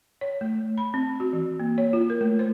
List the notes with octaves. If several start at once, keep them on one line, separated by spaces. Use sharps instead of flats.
C#5
A3
B5
C4
F#4
E3
A#3
C#5
F4
A#4
A3
C5